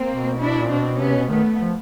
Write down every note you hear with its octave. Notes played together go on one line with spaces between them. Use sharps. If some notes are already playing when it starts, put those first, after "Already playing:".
Already playing: A#3 C4
B2
D4 E4
A#2
B2 C4 D4
C3 B3 C#4
B2
D#3 A3 B3
F3